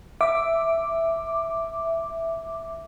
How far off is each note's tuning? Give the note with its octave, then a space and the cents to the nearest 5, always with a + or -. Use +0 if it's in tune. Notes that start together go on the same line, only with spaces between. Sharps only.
E5 +0 D6 +0